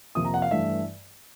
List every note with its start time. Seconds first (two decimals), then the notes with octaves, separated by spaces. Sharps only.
0.15 F2 C3 F3 A#3 D#6
0.25 A#5
0.34 F#5
0.42 F5
0.51 G2 E3 A3 E5